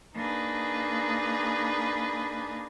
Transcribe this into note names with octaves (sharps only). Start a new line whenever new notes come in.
A#3 D4 D#4 G#4 B4